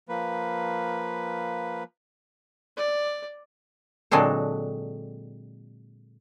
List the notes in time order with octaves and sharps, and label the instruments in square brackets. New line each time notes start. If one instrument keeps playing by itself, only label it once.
[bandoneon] F3 A#3 B4
[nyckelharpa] D5
[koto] A#2 D3 F#3 G#3 C4 A4